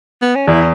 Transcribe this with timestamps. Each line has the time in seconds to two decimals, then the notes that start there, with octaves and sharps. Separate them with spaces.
0.22 B3
0.35 C#4
0.47 E2 E4